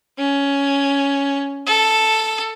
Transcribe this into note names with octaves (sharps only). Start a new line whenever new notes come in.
C#4
A4